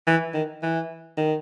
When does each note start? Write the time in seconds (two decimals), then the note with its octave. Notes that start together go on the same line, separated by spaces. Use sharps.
0.07 E3
0.34 D#3
0.63 E3
1.17 D#3